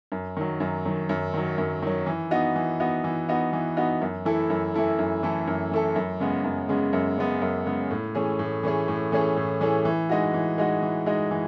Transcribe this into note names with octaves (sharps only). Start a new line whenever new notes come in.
F#2
D#3 F#3
F#2
D#3 F#3
F#2
D#3 F#3
F#2
D#3 F#3
E3
B3 D#4 F#4
E3
B3 D#4 F#4
E3
B3 D#4 F#4
E3
B3 D#4 F#4
F#2
E3 A3 E4 A4
F#2
E3 A3 E4 A4
F#2
E3 A3 E4 A4
F#2
E3 A3 E4 A4
F#2
C#3 G#3 B3
F#2
C#3 G#3 B3
F#2
C#3 G#3 B3
F#2
C#3 G#3 B3
A2
E3 A3 C#4 G#4
A2
E3 A3 C#4 G#4
A2
E3 A3 C#4 G#4
A2
E3 A3 C#4 G#4
E3
G#3 D#4 F#4
E3
G#3 D#4 F#4
E3
G#3 D#4 F#4
E3